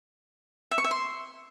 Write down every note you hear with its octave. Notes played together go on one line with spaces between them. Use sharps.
E5
C#6
E5
C6